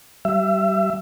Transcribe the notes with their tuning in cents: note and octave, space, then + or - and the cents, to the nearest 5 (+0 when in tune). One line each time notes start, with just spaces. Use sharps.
G3 -30 E5 +30